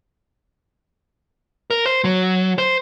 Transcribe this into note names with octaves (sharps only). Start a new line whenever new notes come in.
A#4
C5
F#3
C5